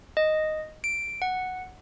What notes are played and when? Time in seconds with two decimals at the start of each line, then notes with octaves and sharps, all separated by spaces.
0.17 D#5
0.84 D7
1.22 F#5